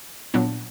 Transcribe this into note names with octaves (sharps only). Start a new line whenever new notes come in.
A#2 F#3 B3 D4